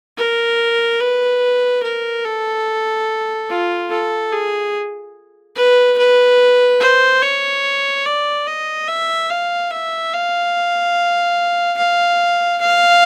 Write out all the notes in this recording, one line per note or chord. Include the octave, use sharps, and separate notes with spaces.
A#4
B4
A#4
A4
F4
A4
G#4
B4
B4
C5
C#5
D5
D#5
E5
F5
E5
F5
F5
F5